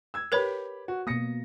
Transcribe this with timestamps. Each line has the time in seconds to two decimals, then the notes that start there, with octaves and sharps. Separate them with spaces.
0.14 E6 G#6
0.32 G4 A#4 B4 C#5 B5 F7
0.88 F#4
1.07 B2 A#3 D#6 A#6 C#7